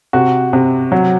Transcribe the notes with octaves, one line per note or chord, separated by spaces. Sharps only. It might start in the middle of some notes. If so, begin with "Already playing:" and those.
C3 F#4
C3
F#3